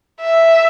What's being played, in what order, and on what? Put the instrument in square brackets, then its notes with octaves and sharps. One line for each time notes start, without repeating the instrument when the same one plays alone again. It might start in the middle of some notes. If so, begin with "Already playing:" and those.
[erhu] E5